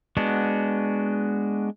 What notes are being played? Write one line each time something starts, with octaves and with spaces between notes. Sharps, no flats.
G#3 B3 D4 F#4